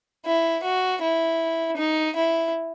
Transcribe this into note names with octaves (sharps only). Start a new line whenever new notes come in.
E4
F#4
E4
D#4
E4